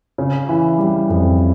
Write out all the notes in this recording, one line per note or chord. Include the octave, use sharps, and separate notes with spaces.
C#3
E3
G3
F2